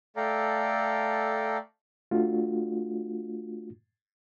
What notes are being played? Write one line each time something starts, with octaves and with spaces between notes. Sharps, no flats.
A3 A4 D5 F5 G5 A#5
A3 D4 F4 F#4